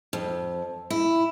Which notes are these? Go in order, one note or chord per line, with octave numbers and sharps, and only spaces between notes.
F2
E4